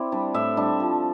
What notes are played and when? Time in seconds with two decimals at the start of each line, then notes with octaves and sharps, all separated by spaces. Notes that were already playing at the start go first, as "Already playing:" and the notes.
Already playing: C4 E4 D5
0.12 G3 D4
0.34 A2 E5
0.57 G3 D4
0.80 F3